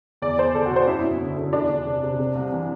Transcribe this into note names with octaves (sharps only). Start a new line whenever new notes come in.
E2 D5
E2 C5
E2 A4
F#4
B2 C5
F#2 E4
F#2
D3
D3
E2 D4
E2
C3
C3
C3
C2
E3